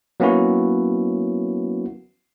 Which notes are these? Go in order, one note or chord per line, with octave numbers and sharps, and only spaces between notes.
F#3 A#3 B3 C#4 E4 F#4